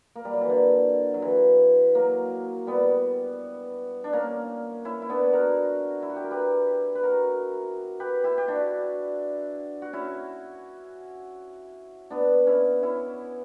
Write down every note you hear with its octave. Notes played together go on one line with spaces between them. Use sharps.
A#3
G3
F#3
E3
D3
F#3
E3
F#3 A#3
G3 B3
D4
A#3 C#4
C#4 E4
E4
B3 D4
F#4 A#4
E4
F#4
G4
A#4
G4 B4
B4
F#4 A#4
G4 B4
E4 G4
G4
D4 F#4
F#4
C#4 E4
B3 D4
C#4 E4
C#4 E4